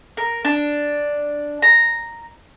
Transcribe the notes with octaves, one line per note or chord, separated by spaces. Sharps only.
A#4
D4
A#5